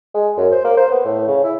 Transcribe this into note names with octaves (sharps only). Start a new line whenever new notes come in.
G#3
F#2
C5
A#3
C5
B3
A2
C#3
E4